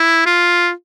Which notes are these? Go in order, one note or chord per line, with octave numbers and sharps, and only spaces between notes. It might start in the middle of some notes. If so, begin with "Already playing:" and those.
Already playing: E4
F4